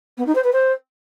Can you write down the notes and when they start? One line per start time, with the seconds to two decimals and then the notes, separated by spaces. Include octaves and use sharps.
0.18 B3
0.26 D#4
0.35 C5
0.44 B4
0.53 C5